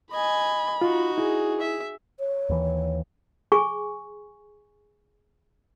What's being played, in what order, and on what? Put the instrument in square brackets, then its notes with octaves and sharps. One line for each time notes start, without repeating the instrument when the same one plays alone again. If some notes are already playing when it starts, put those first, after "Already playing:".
[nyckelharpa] D#5 G#5 [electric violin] B5
[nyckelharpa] D#4 F#4 [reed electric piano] F4
[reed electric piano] E4 [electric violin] G#4
[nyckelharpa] E5
[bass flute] C#5
[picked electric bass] D#2 E3
[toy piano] G#4 G#5 C#6